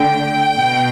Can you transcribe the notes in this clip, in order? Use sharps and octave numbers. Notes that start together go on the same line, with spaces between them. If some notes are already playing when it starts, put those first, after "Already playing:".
Already playing: D3 A3 G5
B2